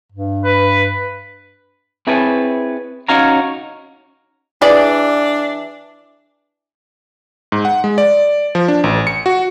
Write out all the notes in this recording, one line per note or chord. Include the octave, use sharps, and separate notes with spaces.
G2
B4
C4 E4 G#4 B4 C#5 A5
C#4 D#4 F#4 C#5 F5 A#5
E3 D4 G#4 D5
G#2
F#5
G#3
D5
F3
D4
A1
C#7
F#4